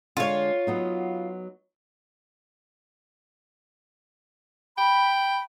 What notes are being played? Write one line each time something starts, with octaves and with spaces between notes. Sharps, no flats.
D3 G#3 F4 C#5
F#3 B3 D#4
G5 B5